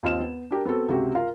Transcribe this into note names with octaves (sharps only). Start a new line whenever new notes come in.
D#2 C4 F4 D#5 F6 E7
B3
D4 G4 A#4
B3 C4 F#4 A4
C#2 C3 F#4 G4
F4 A#4 F5